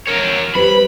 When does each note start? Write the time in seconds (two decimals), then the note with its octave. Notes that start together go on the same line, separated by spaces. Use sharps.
0.07 A#4 C#5
0.55 G3 B4 C5 B5